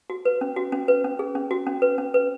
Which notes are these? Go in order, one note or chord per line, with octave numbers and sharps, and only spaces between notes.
F#4
B4
C#4
F#4
C#4
B4
C#4
G#4
C#4
F#4
C#4
B4
C#4
B4